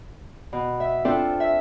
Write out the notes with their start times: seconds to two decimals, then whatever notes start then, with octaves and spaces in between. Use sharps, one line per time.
0.53 B2
0.80 E5
1.05 C4 D4 F4 A4 C5
1.40 E5